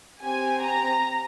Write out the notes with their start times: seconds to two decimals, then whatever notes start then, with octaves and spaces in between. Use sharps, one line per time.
0.22 C4 G4 G#5
0.62 A#5